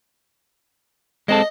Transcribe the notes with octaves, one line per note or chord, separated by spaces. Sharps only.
G#3 C4 A4 D#5